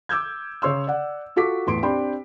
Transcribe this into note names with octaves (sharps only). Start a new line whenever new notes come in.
D6 E6 G6 G#6
C#3 C#5 C6 E6
D5 F#5
F4 F#4 A4 D6 B6
E2 A2 C6 D7
C4 D4 G4 G5 B5 C6